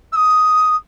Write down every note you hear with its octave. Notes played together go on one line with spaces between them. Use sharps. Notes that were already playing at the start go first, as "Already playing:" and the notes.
E6
D#6